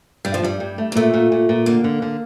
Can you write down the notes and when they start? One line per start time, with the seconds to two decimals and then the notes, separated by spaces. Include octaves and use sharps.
0.25 G2 G3
0.34 F3
0.43 G2 G3
0.60 G2
0.78 A3
0.92 A#3
0.95 A#2 A3
1.14 A#2
1.32 A#2
1.49 A#2
1.66 D3 A#3
1.84 D3
2.02 D3